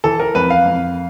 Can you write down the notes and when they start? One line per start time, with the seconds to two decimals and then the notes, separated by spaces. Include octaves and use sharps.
0.04 E3 A4
0.20 A#4
0.35 F2 B4
0.50 F5
0.66 F2